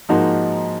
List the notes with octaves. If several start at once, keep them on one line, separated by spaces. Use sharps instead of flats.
G#2 F3 A#3 D#4 F#4